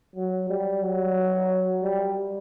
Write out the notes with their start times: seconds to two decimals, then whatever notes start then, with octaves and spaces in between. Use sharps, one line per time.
0.15 F#3
0.49 G3
0.82 F#3
1.83 G3